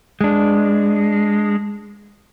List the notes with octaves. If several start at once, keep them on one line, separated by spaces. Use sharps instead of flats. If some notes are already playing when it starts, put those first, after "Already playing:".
G#3 D4